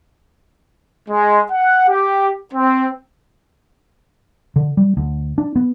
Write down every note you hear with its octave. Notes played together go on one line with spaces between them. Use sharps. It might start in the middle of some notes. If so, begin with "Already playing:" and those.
G#3
F#5
G4
C4
D3
G3
D2
D4
B3